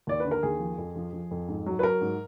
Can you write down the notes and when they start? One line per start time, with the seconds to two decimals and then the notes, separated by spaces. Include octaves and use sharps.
0.07 D#2 D5
0.20 D3 B4
0.31 A#4
0.43 D#2 G#4
0.60 F3
0.78 F2
0.96 F3
1.13 F3
1.31 F2
1.48 G#2
1.66 F#3
1.79 B4
1.83 F#3 A#4
2.01 G#2